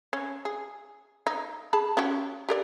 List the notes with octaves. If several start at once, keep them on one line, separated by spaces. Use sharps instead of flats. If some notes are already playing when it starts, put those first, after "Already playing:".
C#4
G#4
D#4
G#4 A5 B5
C#4 F#4 G4
G4 A#4 D5